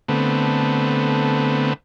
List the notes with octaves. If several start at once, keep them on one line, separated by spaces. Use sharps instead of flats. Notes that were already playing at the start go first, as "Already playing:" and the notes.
D3 A3 B3 C4